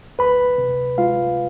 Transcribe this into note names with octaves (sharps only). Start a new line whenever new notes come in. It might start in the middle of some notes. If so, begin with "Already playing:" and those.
D2 B4 B5
C3
G#3 F4 F5